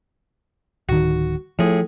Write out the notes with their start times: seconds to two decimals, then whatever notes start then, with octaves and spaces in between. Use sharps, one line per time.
0.89 D1 D#3 F#4
1.59 A2 F3 G#4